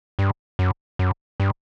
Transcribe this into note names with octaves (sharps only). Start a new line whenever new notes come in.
G2
F#2
F#2
G2